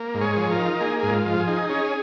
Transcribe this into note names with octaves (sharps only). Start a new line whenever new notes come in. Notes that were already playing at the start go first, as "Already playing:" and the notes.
Already playing: A#3
G#2
G#4 C#5
F3
F4 A#4
D#4
A#3 G#4
G#2 G#4
F4
F3
G#4
D#4
C#4 G#4